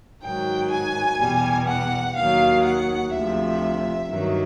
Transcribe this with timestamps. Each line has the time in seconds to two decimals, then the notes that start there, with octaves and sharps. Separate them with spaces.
0.22 G#2 D#3 F#3 G5
0.71 G#5
1.20 E2 B2 G3
1.68 F#5
2.16 D#2 D#3 F#3 F5
2.65 F#5
3.12 D2 C3 F3 E5
4.09 G2 D#3 F#3